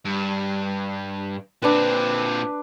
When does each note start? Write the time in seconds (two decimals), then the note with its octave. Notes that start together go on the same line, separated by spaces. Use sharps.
0.05 G2
1.62 A#2 C4 D4 B4